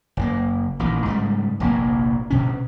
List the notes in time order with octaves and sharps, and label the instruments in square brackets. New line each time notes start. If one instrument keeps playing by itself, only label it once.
[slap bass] F#1 A2 A#3
A1 A#2 D#3
G#2 C#3 F3 G3
F1 A#1 G#2 A#3
D2 B2 C#4